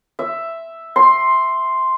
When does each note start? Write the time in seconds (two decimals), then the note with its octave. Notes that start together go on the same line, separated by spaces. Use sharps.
0.19 E5
0.96 C6